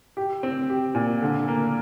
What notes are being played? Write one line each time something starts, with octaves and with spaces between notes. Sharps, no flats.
G4
C4
G4
A#2
D3
A#3